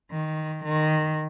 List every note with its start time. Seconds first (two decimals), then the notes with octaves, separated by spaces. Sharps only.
0.10 D#3
0.63 D#3